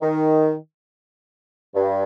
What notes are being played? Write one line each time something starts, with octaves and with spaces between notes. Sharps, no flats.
D#3
G2